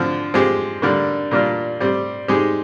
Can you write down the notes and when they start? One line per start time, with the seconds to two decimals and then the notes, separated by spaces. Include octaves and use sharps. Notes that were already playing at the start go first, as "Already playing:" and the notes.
Already playing: D3 F3 C4
0.34 F3 G#3 C4 G4
0.82 D3 G3 A#3
1.31 A#2 G3 A#3 D4 F4
1.80 G3 C4 G4
2.28 G#3 C4 D#4 G4